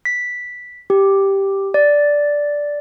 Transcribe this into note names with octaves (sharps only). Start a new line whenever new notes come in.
B6
G4
D5